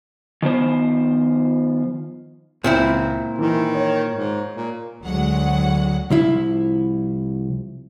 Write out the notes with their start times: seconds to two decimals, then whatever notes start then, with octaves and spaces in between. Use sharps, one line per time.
0.43 D#3 F3 B3 C5
2.64 C#2 A#2 C4 E4
3.39 D#3 E3
3.74 C#5
4.12 G#2
4.54 A#2
5.02 D2 F#3 G#3 F#5
6.10 C2 F3 E4